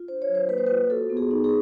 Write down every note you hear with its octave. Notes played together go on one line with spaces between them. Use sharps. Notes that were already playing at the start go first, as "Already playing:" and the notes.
Already playing: F4
D4 C5
C#5
F#3
C5
A#3 B4
C5
F4 B4
F#4 A4
B3
G#4
D#4
G#4